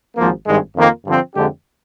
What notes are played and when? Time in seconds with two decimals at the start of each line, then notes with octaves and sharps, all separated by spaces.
0.17 G#1 G#2 F3 A#3
0.46 G#1 G2 D#3 G#3
0.76 F2 D#3 A#3 F4
1.04 G2 D3 F3 C4
1.35 F2 D3 G#3 D4 G4